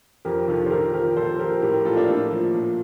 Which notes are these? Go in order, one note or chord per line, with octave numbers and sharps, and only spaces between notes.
F2 G4 A#4
C3 D#3 F4 A4
C5
A#2 G4 A#4
F3 G4 A#4
A#2 A4 C5
F3 G4 A#4
A2 G4 A#4
G4 A#4
F3 F4 A4
A#3 D4
A2 A#3
F3
A#2